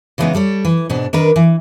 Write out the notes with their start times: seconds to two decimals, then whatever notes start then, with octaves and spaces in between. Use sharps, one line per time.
0.18 C#3 E3 G3 G#3 B3 D#4
0.35 G3 A4 C#5
0.65 E3
0.90 G#2 B2 D4
1.13 D#3 D4 A#4 B4
1.36 E3